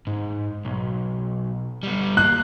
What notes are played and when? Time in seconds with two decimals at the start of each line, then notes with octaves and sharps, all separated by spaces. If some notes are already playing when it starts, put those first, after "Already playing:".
0.07 G#2
0.65 B1
1.83 G3 B3
2.17 A#3 F#6